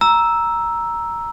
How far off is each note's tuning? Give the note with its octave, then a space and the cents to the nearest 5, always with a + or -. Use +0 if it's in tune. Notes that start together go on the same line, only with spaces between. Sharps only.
A#5 +5 E6 +0